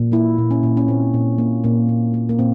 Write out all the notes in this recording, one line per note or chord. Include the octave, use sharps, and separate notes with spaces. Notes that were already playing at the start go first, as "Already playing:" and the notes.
Already playing: A#2
A#3 E4
A#2
C#4
A#2
C#4
A#2 C4
A#2
A#3
A#2 A#3
A#2
A#3
A#3
A#2 C4